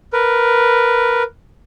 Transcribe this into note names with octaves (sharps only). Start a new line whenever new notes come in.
A#4 B4